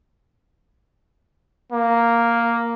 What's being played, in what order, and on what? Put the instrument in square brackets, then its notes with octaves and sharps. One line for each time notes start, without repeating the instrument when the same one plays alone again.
[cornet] A#3